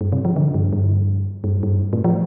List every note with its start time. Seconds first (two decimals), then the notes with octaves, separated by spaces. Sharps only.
0.01 G2
0.12 C3
0.25 F3
0.36 D3
0.54 G2
0.73 G2
1.44 G2
1.63 G2
1.93 A2
2.04 F3